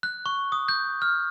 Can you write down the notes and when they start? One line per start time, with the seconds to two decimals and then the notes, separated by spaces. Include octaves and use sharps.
0.03 F#6
0.26 C#6
0.52 D#6
0.68 G6
1.02 F6